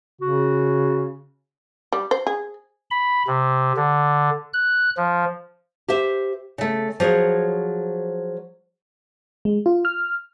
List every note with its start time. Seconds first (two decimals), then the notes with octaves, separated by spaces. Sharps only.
0.21 C#3 F#4
1.92 G3
2.11 C5
2.27 G#4
2.91 B5
3.27 C3
3.77 D3
4.53 F#6
4.97 F3
5.88 G4 C5 E5
6.58 C#3 A3
7.00 F3 F#3 G#4 C#5
9.45 G#3
9.66 F4
9.85 F6